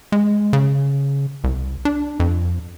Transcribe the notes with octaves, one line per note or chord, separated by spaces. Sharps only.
G#3
C#3
C2
D4
F2